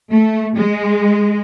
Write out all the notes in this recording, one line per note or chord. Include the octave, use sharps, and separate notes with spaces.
A3
G#3